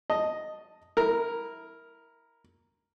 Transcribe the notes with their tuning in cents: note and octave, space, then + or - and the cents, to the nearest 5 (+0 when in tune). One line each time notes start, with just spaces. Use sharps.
D#5 +0 A5 +0
E4 -20 A#4 +0